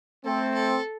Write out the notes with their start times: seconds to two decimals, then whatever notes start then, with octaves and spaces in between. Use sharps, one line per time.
0.25 A3 C4 A4
0.54 A4